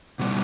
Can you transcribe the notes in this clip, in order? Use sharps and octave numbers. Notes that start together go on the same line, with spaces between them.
B2 G3 B3